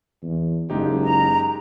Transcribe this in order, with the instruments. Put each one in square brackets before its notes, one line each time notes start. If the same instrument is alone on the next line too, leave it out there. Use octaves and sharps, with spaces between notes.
[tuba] E2
[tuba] F#1 [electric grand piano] G#3 D#4 G4
[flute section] A#5